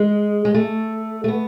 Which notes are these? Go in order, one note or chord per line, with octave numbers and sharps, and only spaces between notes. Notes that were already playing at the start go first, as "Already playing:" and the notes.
Already playing: G#3
G#3
A3
A3
B3